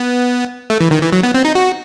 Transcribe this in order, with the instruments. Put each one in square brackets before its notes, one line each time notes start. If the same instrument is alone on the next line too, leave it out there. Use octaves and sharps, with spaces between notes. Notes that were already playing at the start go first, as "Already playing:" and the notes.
Already playing: [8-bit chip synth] B3
A3
E3
D#3
E3
F#3
B3
C4
D#4
F#4